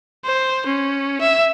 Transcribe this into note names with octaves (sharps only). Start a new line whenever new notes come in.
C5
C#4
E5